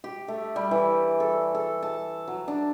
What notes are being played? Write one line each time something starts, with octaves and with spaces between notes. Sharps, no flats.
G4
A3
G3
E3
A4
A4
A5
F#3
D4